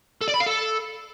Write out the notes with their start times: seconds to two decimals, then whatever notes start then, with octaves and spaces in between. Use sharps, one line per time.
0.21 A4
0.28 D5
0.34 B5
0.40 F5
0.46 A4